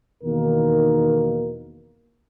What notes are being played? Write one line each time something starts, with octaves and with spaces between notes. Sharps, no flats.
E2 B2 D#3 A#3 D#4 A#4